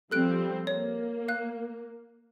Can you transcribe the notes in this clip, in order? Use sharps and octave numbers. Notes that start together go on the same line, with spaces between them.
F3 G3 C4 A4 F#6 D7
A#3 C#5
F5 F#6